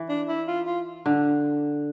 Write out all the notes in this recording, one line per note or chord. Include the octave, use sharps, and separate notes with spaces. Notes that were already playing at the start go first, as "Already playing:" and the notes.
Already playing: E3
D4
E4
F4
F4
D3